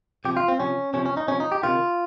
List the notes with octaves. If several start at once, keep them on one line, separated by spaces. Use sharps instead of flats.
C3 F3 G4
F4
C4
C3 F3 C#4
C3 F3 C#4
C#4
D#4
C3 F3 C#4
D#4
G4
C3 D#3 F4